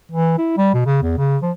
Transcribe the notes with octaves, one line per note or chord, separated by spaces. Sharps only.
E3
E4
G3
B2
C#3
E2
C#3
F3